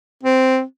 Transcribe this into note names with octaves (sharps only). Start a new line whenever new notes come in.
C4